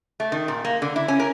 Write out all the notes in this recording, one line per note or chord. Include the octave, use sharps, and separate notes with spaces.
A3
D#3
A#2
A#3
D3
E4
C#4
A#4